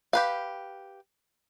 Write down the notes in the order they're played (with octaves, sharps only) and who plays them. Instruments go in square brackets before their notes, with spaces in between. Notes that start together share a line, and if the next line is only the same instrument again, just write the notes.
[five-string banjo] G4 B4 F5